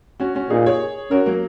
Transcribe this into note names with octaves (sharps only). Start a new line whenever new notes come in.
C#4 F#4
C#4 F#4
A#2 D#4 G#4
G#4 C#5
C#4 F#4 A#4
F#3 A#3